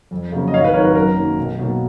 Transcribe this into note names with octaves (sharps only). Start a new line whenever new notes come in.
F2
C#3 F#3 A#3
D#5
G#1 C#5 F5
B4
G#2 D#3 F#3 A#4 C#5
B4
F#2 A#4
D#3 F#3 A#3
B1
B2 F#3 A#3